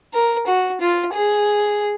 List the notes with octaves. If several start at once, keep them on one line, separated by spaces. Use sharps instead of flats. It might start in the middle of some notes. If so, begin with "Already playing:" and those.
A#4
F#4
F4
G#4